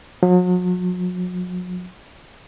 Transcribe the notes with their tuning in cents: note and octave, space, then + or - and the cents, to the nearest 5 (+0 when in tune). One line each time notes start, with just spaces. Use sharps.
F#3 -40